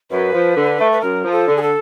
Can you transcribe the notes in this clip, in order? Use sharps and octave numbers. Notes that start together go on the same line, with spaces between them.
F#2 B4
F3
D3
A3
B4
F#2 A#4
F3
A4
D3
G#4
A4